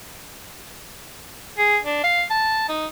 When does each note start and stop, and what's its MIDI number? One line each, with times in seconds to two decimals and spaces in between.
1.58 1.78 68
1.85 2.00 62
2.04 2.25 77
2.30 2.65 81
2.69 2.86 63